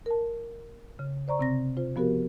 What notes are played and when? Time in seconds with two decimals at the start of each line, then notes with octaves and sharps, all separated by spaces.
0.06 A#4 A5
0.99 C#3
1.28 C5 D5 A#5 C#6
1.39 C3 C4 A#6
1.77 F4 C5
1.96 F3 B3 F#4 G4 A#4